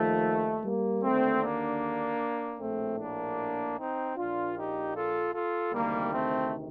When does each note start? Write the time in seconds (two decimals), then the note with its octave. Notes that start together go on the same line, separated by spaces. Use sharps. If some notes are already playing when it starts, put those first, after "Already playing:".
Already playing: D#2 D#3 F3 A3
0.64 G3 A#3
1.03 D#2 D3 A3 C4
1.42 A#3 D4
2.59 A#1 A2 A3 C4
2.98 A#3 D4
3.77 C4 D#4
4.16 A#1 A#2 D4 F4
4.55 D#4 G4
4.93 F4 A4
5.33 F4 A4
5.72 D2 C3 D#3 G3 A#3
6.11 A3 C4